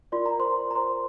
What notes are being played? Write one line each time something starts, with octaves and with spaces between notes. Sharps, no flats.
F4 A#4 D5 C6
A#5
C5 C6
A#5
C5 C6